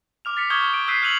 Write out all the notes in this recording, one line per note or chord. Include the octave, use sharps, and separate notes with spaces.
D6 F6 F7
A6 B6 C#7
C#6 D#6 F6 G6 G#6 G7
D7
E6 F#6 G6 B6 C7 D#7
F6 F#6 C#7 D#7 F7 F#7